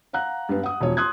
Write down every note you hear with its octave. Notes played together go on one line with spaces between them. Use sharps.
F5 F#5 A#5 F#6
G2 B3
F#5 D#6
E1 F3 C#5
C6 D#6 F#6 G#6